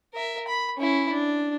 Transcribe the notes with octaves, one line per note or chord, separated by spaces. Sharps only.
A#4 E5
B5
C#4 E4
D4